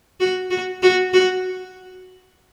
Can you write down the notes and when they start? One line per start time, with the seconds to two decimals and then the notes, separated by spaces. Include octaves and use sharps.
0.20 F#4
0.50 F#4
0.83 F#4
1.13 F#4